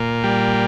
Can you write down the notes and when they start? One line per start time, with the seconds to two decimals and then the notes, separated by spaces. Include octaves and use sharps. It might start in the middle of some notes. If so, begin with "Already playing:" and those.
Already playing: A#2
0.24 G3